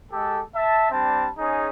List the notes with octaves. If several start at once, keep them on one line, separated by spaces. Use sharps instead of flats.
G#3 G4 A4
E5 A5
G3 C4 D4 A5
C#4 D#4 G#4